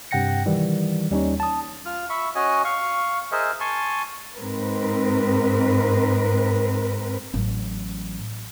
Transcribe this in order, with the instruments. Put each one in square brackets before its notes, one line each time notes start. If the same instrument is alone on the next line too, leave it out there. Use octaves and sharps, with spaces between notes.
[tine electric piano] G2 C3 F#5 G5 A#6 C#7
D#3 E3 G3
D#2 G3 C#4 D#4 C#5
A5 D#6
[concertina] F4 F6
E5 B5 C#6
C#4 F#4 C#5 D#5 G#5
F5 C#6
G#4 A#4 C5 D#5 E5
G#5 A5 C6 C#6
[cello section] G#2 C4 A#4 B4
[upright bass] A1 F#3